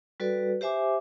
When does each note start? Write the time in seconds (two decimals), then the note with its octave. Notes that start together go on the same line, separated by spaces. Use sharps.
0.20 G3 F#4 A4 B4 D5
0.61 G4 C5 E5 G#5 D6